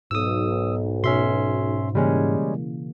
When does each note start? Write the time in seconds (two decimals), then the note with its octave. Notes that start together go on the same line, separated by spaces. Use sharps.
0.11 B1 G#2 D#6 E6
1.04 B2 C#4 F#4 E5 C6
1.95 C#3 E3 G3 G#3 A#3 C#4